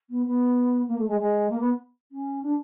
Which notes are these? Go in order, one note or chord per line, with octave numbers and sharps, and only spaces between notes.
B3
B3
A#3
A3
G#3
G#3
A#3
B3
C#4
D4